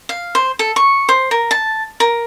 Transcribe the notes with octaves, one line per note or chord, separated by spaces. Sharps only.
F5
C5
A4
C#6
C5
A#4
A5
A#4